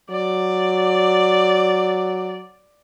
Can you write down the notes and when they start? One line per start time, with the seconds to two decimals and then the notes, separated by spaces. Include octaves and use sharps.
0.10 F#3 D5